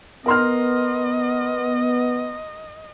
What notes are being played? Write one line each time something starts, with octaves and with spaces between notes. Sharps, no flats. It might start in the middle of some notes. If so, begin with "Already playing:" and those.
B3 A#4 D#5 C6 F6